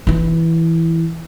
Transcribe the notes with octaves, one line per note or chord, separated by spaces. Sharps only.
E3 E4